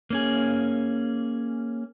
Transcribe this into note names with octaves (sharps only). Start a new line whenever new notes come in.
A#3 C#4 G#4